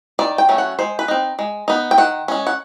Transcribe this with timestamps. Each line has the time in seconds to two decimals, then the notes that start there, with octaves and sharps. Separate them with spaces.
0.19 D#3 D5
0.38 G5
0.49 F#3 A3 C#4
0.58 F#5
0.79 G#3 C5
0.99 B4
1.08 C4 D#4
1.39 G#3
1.68 B3 D#4
1.91 G5
1.98 D#3 F#5
2.28 G#3 C#4
2.47 F#5